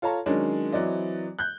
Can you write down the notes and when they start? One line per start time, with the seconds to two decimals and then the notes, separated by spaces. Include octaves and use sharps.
0.02 F4 A4 C#5 A5 A#5
0.26 D#3 F#3 G#3 C#4 D4
0.72 E3 F#3 C4 D5 D#5
1.39 F#6 G6